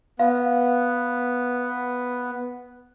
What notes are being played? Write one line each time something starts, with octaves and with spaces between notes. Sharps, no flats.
B3 F5